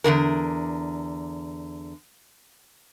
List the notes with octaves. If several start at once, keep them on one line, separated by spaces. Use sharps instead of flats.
E2 G2 D3 A#4